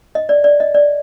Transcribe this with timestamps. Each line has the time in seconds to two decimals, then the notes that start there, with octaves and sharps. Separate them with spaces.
0.15 D#5
0.29 D5
0.44 D5
0.60 D#5
0.74 D5